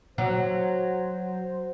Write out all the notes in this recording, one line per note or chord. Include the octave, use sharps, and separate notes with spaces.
F#3 C5